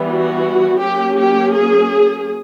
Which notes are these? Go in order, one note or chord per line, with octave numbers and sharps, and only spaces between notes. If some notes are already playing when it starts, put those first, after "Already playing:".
Already playing: E3 G3 B3
F#4
F#3 A#3 C#4 G4
G4
G#4